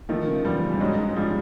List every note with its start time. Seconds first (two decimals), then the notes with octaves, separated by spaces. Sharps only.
0.09 D#3 F3 A3
0.27 C#3
0.45 E2 F3 G3
0.63 C#3
0.72 G3
0.80 G#2 F#3 G#3
0.98 G#2
1.16 G#2 F3 G3